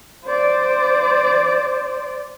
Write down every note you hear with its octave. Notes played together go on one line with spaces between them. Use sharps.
C5 D5